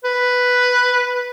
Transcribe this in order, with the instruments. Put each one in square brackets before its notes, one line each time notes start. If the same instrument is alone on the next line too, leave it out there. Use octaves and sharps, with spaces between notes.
[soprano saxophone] B4